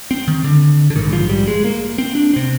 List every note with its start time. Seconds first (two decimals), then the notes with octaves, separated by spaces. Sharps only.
0.11 C4
0.28 D#3
0.44 D3
0.90 D3
0.96 A#1 G#2 D#3
1.13 F3
1.29 G3
1.47 G#3
1.64 A#3
1.98 C4
2.15 D4
2.34 C3 C4